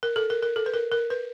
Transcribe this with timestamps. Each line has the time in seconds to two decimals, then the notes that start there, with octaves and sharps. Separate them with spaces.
0.03 A#4
0.16 A4
0.30 A#4
0.43 A#4
0.56 A4
0.66 B4
0.74 A#4
0.92 A#4
1.10 B4